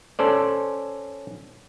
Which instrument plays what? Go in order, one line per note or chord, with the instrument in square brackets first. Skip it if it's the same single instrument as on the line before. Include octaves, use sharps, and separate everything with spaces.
[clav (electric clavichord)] C#4 A4 C5 D5